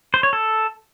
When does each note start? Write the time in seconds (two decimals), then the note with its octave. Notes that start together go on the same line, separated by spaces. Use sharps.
0.14 C5
0.23 C#5
0.33 A4